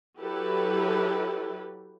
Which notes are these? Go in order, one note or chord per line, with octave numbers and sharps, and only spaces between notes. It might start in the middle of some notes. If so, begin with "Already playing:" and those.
F#3 E4 G4 A4 B4